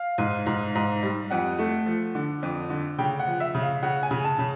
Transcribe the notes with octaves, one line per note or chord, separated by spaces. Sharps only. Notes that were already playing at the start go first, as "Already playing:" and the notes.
Already playing: F5
G#2
G#2
G#2
G3
F2 F#5
A3
F3
D3
F2
D3
C#3 G5
F#5
F3
E5
C#3
F5
C#3 F#5
G#5
C#3
A5
C#3